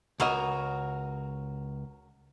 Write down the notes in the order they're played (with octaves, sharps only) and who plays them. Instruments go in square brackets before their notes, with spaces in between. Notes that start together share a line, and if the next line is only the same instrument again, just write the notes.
[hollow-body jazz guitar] C#2 D#5 [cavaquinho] F#4 A#4 C#5